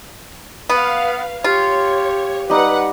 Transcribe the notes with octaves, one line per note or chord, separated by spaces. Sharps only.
B3 B4 F5
F4 G4 C#5
G3 D#4 B4 F#5